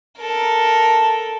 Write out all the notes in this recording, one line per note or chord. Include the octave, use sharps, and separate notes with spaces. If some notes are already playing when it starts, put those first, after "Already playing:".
A4 A#4